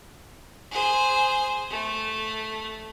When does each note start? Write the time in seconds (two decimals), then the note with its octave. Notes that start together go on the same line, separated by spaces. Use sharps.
0.71 G#4 C5
1.70 A3